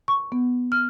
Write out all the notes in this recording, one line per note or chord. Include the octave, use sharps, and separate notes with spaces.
C#6
B3
F6